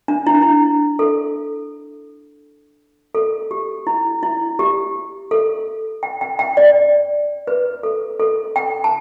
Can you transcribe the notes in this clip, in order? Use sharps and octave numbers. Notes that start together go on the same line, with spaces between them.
D4
E4
D4
E4
A4
A4
G4
E4
E4
G4
A4
G5
G5
G5
D5
B4
A4
A4
G5
A5